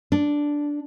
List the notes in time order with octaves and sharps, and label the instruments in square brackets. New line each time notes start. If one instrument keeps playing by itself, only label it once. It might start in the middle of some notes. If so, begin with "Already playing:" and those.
[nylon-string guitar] D4